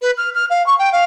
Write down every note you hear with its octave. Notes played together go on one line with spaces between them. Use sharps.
B4
F6
F6
F5
C#6
G5
F5